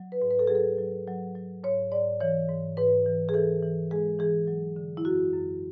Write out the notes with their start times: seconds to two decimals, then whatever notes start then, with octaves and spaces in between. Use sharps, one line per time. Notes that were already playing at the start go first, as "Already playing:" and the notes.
Already playing: F#3
0.12 B4
0.22 G#2
0.31 B4
0.39 A4
0.47 F#3 G#4
0.55 A4
0.79 F#3
1.07 F#3
1.35 F#3
1.63 G#2 C#5
1.92 G#2 D5
2.21 E3 C#5
2.49 G#2
2.77 G#2 B4
3.06 E3
3.29 G#4
3.34 E3 A4
3.62 E3
3.91 G#3 G#4
4.19 E3 G#4
4.47 F#3
4.76 D3
4.97 E4
5.05 F#2 F#4
5.34 F#2